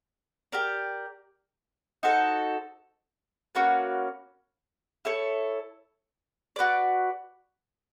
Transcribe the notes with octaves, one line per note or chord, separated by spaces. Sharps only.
G4 A#4 D5
D#4 F#4 A4 C5
A#3 C#4 F#4 B4
E4 A4 C#5
F#4 B4 D5